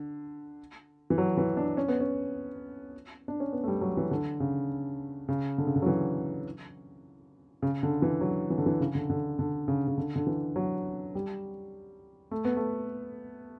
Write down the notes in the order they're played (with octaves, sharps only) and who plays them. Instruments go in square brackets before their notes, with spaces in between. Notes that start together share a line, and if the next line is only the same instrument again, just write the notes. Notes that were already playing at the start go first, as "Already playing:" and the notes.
Already playing: [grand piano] D3
E3
F#3
E3
D4
C#4
B3
C#4
D4
C#4
B3
A3
G3
F#3
E3
D3
C#3
C#3
D3
C#3
D3
F#3
E3
C#3
D3
E3
F#3
E3
D3
E3
C#3
D3
D3
D3
C#3
C#3
D3
D3
E3
F#3
G3
A3
B3
A3